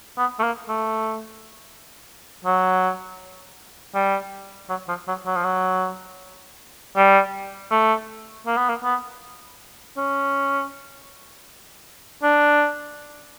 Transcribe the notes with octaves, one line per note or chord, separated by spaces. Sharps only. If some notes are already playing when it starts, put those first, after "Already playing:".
B3
A3
A#3
A3
F#3
G3
F#3
F3
F#3
F#3
F3
F#3
G3
A3
A#3
B3
A#3
B3
C#4
D4